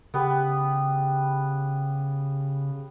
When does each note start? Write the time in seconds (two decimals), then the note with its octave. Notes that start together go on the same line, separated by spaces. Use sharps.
0.14 C#3 B3 G4 B4